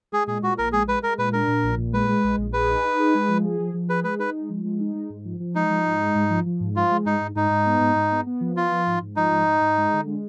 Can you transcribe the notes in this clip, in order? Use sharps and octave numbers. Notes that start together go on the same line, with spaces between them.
G#3 G#4
A#2 G#4
A#2 F#4
A#1 A#4
G#3 G#4
G#3 B4
G#3 A#4
A#2 B4
D4 A#4
A#2
A#1
A#2
G#3 B4
G#3
A#1
A#1
G#4 B4
D#4
D#4
G#4
G#3
F3
G#4
F3
F3
G#4 B4
G#3 B4
D#4 B4
G#3
F3
G#3
D#4
G#3
G#2
F3
F3
G#3 D#4
F3
G#2
G#3
G#2
F3
F3
G#2
F3 F4
G#3
G#2 D#4
G#2
G#2 D#4
G#2
B3
G#2
G#2
B3
B3
F3
B3 F4
F3
G#2
G#2
F3 D#4
G#2
G#2
G#2
G#3
D3
G#3